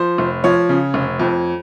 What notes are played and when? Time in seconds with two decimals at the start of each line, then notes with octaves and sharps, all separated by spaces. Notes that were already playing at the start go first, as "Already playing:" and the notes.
Already playing: F3 C5
0.18 F1
0.44 F3 C#5
0.69 C#3
0.94 F1
1.20 F2